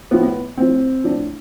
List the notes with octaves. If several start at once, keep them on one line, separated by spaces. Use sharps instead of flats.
A2 F3 B3
B3
A2 F3 C4
A2 F3 D4